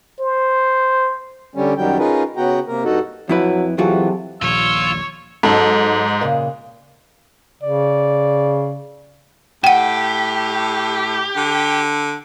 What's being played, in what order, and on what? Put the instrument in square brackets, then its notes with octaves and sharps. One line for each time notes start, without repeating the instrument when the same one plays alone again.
[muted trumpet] C5
[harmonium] D3 G3 C#4
F#2 D#3 F#3 G3 G5
C#4 D#4 F4 G#4 A#4 B4
C#3 B3 F#4 G5 A#5
C3 A#3 A#4
G2 D#4 F#4 A4
[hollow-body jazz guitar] F2 E4 B4 [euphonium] F#3
[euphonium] C3 [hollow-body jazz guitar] E3 F4 F#4 [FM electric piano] F#3 G#4 A4
[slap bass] D#1 A#1 [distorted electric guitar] F4 [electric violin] C#5 [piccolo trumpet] E6
[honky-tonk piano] G#2 [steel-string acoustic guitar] F#3 A4 A5
[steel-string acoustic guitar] A#2 C#3
[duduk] C#3 [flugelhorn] D5
[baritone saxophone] A2 [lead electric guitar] G4 [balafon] F#5 G5
[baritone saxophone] D3